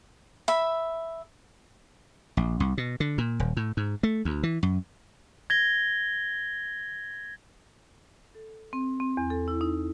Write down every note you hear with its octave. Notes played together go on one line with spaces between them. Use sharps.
E5 B5
A#1
C2
B2
D3
A#2
D#1
A2
G#2
A3
D2
E3
F#2
G#6 A#6 G7
A4
C4
C4
E2
A4
E4
D#4